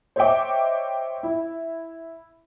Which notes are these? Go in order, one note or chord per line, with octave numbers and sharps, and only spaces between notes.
C5 C#5 D#5 E5 G5 D6
E4